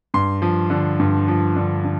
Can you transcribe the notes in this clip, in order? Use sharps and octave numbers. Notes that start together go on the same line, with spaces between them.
G2 C6
F3
D3
G2
F3
D3
D3